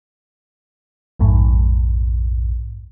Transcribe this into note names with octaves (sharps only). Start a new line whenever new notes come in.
A#1 F2 G#2